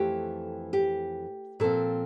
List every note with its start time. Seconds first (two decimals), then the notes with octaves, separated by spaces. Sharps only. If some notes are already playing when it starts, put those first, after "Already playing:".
Already playing: F2 E3 A3 G4
0.73 G4
1.60 A#2 F3 C4 A4